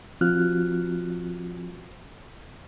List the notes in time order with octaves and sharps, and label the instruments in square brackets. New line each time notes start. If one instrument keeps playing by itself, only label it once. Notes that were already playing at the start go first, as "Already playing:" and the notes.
[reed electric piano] F3 C4 F4 F#4 F6 F#6